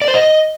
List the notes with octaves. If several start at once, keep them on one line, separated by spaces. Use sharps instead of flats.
D5
C5
D#5